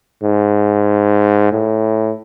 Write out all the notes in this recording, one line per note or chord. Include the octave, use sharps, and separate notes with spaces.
G#2
A2